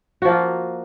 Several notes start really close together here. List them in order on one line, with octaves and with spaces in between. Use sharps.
F#4 F3 A#3 F4